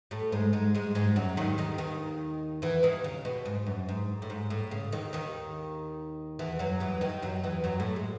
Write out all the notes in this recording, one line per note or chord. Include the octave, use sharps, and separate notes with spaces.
A2 A3
G#2 G#3
G#2 G#3
G#2 G#3
G#2 G#3
F#2 F#3
D#2 D#3
D#2 D#3
D#2 D#3
E2 E3
D#2 D#3
C#3
B2
G#2
F#2
G#2
A2
G#2
A2
C#3
D#2 D#3
D#2 D#3
E2 E3
F#2 F#3
E2 E3
D#2 D#3
F#2 F#3
E2 E3
F#2 F#3
A2 A3
G#3